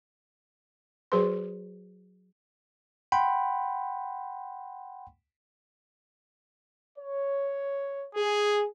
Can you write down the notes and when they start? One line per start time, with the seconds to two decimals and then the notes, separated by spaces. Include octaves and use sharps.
1.12 F#3 F#4 G#4 B4 C5 C6
3.12 F#5 G5 B5 C6
6.98 C#5
8.15 G#4